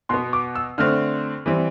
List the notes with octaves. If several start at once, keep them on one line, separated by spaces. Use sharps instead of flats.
B2 B3 C6
D6
E6
D3 A3 C4 F6
E3 G3 C4